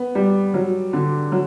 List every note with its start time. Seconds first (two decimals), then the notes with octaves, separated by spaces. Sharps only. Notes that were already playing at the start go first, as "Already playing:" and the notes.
Already playing: B3
0.15 G3
0.54 F#3
0.93 D3
1.32 F#3